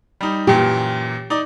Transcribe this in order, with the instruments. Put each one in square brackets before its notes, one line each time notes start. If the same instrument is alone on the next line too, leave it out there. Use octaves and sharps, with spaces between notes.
[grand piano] G3 D#4
[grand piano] F#2 A#2 E3 [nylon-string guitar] G4
[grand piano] D#4 D5 D6